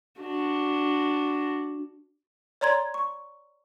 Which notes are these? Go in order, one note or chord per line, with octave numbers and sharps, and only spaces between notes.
D4 F#4
C#5 D5 A#5 C6 G#6
C#6